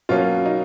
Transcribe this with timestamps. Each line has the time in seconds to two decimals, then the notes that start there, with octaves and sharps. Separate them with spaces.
0.09 B2 F#3 A#3 C#4 F4
0.45 D#4